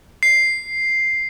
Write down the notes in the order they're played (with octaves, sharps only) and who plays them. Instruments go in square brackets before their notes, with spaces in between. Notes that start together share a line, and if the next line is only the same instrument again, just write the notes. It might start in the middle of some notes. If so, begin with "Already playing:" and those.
[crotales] C7